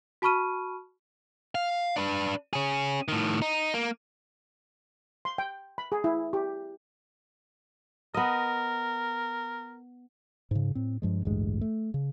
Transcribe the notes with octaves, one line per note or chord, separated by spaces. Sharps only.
F#4 A5 B5 C#6 F6 D#7
F5
D4 B4
C#4 G#4
A2 D#3
D#4
A#3
C6
G5
B5
G#4
E4
G4
B3 A#4 D#5
G#2 C#3
A2 C4
G2 F3 G#3
A1 D2 G2 G#3
A3
C#3